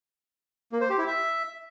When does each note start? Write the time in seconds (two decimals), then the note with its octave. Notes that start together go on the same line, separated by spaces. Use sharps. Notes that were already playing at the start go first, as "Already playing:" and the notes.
0.72 A#3
0.81 C5
0.90 G4
0.98 E4
1.07 E5